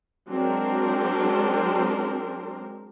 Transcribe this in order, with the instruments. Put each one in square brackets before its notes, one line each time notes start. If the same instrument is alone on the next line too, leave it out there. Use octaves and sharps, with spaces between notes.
[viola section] F#3 G#3 C4 D4 A#4 C5